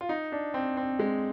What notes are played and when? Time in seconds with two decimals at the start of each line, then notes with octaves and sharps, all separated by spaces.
0.01 F4
0.09 D#4
0.32 D4
0.54 C4
0.77 C4
0.99 G#3